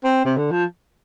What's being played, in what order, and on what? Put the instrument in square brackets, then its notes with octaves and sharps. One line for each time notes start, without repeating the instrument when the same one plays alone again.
[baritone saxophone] C4
C3
D3
F3